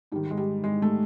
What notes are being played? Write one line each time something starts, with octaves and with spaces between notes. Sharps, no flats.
G#2 D#3 G3
G#3
G3
G#3
A3